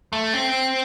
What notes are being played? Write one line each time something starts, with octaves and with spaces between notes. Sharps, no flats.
A3
C4